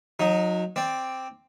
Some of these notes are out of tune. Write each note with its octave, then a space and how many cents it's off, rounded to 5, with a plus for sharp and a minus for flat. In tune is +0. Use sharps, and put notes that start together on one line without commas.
F#3 -30 D#4 +0
C4 +0 D5 +0